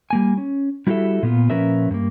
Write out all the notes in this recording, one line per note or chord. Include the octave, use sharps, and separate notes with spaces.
G3 A#3 G#5
C#4
G3 E4 F#4 G4 A4 E5
A#2 B3 F4
A#2 F3 C#4 A#4 B4 E5
G2 A#3